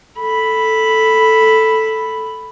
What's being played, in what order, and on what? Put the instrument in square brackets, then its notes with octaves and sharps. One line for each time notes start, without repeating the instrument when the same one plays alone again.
[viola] A4 B5